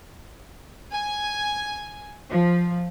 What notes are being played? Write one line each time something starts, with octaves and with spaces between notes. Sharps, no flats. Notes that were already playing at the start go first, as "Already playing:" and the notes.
G#5
F3